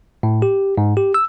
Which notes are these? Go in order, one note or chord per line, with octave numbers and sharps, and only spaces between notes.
A2
G4
G#2
G4
E6